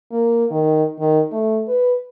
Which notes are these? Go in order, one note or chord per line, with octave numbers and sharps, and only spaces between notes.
A#3
D#3
D#3
A3
B4